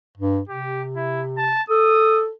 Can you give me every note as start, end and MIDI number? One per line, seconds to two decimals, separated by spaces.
0.17 0.40 43
0.49 1.57 48
0.49 0.83 67
0.96 1.22 64
1.38 1.62 81
1.70 2.31 69
1.70 2.21 87